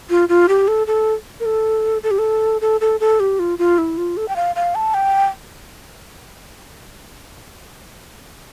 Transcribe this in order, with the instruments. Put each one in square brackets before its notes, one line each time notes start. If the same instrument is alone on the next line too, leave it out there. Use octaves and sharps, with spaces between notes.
[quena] F4
F4
G4
A4
A4
A#4
A4
A4
G4
A4
A4
A4
A4
G4
F4
F4
E4
F4
A4
G5
F5
F5
A5
G5